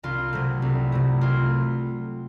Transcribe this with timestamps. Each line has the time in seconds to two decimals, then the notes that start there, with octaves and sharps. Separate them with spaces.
0.03 C2 F4
0.33 C3 F#3 A3
0.62 C2
0.92 C3 F#3 A3
1.21 C2 F4